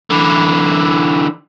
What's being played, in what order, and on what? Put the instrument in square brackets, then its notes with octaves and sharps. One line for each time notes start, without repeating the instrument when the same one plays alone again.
[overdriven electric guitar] D3 E3